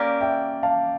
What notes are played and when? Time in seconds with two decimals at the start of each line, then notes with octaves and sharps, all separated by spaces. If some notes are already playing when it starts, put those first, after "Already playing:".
Already playing: A#3 C#4 G4 A#4 D5 F5
0.21 E5 G5
0.63 F5 A5